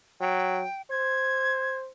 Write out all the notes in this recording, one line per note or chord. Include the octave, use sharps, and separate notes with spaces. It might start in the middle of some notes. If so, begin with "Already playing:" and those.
F#3 G5
C5 G#6